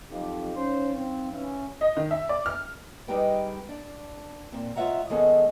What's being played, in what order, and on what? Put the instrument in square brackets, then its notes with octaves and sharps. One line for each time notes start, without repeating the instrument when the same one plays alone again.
[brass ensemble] F2 G4 [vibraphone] F#3 D#4 F5
[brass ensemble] C#4 C5
C4
E3 C#4 E4
[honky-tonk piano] D#5
D#3
E5
D5
F6
[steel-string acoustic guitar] G3 G#3 D#4 G4 B4 G5
D4
A#2 C4
G#3 F4 C#5 E5 F#5 A#5
D#3 G#3 B3 C#4 G#4 A4